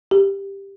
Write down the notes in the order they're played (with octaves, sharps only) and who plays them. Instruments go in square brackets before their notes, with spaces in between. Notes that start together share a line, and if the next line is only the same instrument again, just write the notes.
[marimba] G4